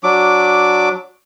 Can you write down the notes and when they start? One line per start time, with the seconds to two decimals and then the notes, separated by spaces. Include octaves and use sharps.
0.04 F#3 D4 D6